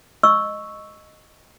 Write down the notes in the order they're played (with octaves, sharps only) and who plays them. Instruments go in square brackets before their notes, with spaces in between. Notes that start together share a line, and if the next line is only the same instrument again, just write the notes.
[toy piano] D#5 C#6 E6